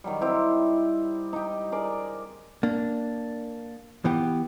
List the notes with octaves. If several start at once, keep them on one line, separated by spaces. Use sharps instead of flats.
D#3 F#3 G3
C4 D#4 E4 G4
D#4 G4
G#4 A#4 D5
A#3 D4
E3 B3 G4